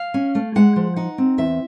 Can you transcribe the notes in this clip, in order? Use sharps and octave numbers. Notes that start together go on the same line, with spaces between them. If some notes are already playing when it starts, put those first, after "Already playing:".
Already playing: F5
C#4
A3
G#3 F#5
F3
D#4 F#5
C4
E2 E5